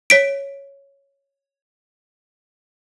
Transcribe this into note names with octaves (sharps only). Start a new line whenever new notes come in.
C#5 B6 D7